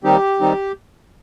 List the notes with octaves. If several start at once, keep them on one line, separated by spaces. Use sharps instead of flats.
D#2 D#3 G3 C4 D#4 G4
D#3 G3 C4 D#4